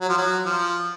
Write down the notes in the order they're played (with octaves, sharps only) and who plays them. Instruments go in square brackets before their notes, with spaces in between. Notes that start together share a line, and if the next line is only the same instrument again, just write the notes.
[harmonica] F#3
F3
F#3
F3